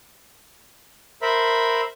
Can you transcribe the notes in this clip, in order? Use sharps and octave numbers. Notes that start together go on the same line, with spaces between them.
A#4 C5 E5 B5